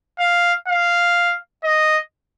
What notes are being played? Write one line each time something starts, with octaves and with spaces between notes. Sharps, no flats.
F5
F5
D#5